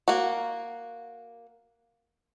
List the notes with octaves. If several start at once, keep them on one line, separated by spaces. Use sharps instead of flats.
A#3 F#4